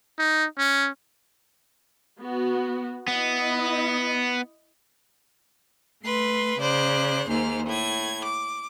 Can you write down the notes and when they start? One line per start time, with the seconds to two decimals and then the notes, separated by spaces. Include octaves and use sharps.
0.19 D#4
0.58 C#4
2.19 B3 F#4
3.08 B3 E4 D#5
6.04 A3 B4 C6
6.58 C#3 C5 D5 F#6
7.28 D#2 G#2 C5 F6
7.65 A2 G#6
8.24 D6